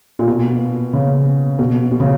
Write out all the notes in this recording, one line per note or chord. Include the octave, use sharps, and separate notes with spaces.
A#2
B2
C#3
B2
B2
C#3